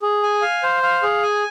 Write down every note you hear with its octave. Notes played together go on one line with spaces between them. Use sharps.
G#4
G#5
F5
C5
F5
G#4
G#5